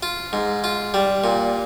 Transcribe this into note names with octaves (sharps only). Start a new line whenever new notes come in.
F4
G#2
F4
G3
A#2